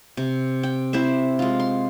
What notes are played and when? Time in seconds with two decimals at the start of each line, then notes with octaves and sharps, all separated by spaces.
0.17 C3
0.63 G5
0.93 C4 E4 C5 E5
1.39 G#3 F4
1.60 C6